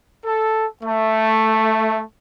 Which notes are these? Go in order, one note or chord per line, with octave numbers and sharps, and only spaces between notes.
A4
A3